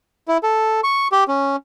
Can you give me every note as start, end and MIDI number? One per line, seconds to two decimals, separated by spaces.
0.28 0.38 64
0.43 0.81 69
0.84 1.08 85
1.12 1.24 67
1.28 1.56 61